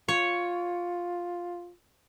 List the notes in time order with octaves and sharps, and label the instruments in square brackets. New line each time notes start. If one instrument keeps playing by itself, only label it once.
[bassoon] F4 [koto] C#5